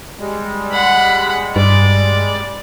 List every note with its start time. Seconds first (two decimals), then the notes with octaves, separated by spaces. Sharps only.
0.19 G3 G#3
0.72 F#5 B5
1.56 G2 D5